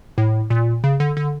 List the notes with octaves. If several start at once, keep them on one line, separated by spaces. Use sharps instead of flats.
A2
A#2
C#3
D3
D3